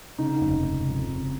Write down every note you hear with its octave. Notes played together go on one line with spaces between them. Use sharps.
C#3 D#4
F1
F1
F2
C#3